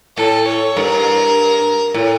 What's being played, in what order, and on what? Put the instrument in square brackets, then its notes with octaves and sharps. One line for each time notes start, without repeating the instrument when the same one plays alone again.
[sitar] A2 [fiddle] A4
[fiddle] C#5
[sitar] G2 [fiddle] A#4
[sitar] A2